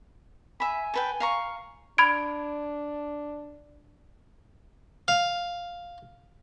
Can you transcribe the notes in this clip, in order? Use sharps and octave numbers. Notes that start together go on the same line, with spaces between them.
E5 G#5 B5
A4 B4 G5
F5 A#5 C#6
D4 B5 G#6 D7
F5